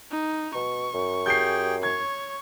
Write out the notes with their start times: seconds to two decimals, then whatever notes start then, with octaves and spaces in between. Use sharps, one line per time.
0.11 D#4
0.54 B2 C#6
0.94 F#2
1.26 G4 G#4 G5 G6 C7
1.83 C#5 C#6 G#6